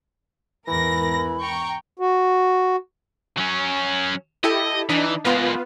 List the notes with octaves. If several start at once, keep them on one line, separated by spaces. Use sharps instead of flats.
E2 G#2 E3 A#4 B5 A#6
G5 A#5 C#6
F#4
F#3 C#4
E4 G4 A4 D#5
E3 D4 D#4
G#3 A#3 B3 F4 B4